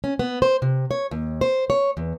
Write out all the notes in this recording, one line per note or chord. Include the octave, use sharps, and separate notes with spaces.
C#4
B3
C5
C3
C#5
D#2
C5
C#5
E2